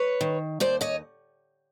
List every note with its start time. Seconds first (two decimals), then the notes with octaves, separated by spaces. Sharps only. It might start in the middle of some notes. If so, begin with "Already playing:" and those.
Already playing: B4 C#5
0.21 D#3
0.60 D#2 C5 D5
0.81 C#5 D#5